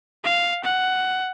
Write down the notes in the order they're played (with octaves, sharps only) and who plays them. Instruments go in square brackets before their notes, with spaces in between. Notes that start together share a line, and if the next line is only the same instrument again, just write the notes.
[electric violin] F5
F#5